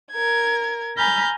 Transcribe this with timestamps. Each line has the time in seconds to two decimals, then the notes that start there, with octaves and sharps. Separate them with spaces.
0.12 A#4 G#6
0.97 G#5 A#5 B5 F6 G6 A6